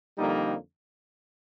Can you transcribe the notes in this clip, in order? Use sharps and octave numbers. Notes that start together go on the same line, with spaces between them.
F2 D3 G3 A#3 D#4